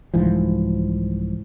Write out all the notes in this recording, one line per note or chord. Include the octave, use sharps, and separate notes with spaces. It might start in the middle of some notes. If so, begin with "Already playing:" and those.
C2 G#2 E3 F3